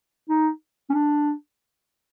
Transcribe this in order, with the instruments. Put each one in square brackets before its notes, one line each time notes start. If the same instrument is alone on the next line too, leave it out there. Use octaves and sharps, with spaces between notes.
[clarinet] D#4
C#4
D4